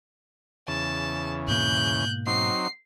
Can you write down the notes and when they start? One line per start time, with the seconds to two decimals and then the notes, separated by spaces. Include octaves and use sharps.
0.68 E2 C#3 A5
1.48 G#2 B2 A#3 F#6 G6
2.27 F#3 C4 D#4 C7